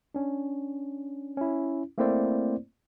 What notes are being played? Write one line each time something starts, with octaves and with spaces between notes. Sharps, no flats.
C#4 D4
C#4 E4
A3 A#3 C4 E4 C5 D5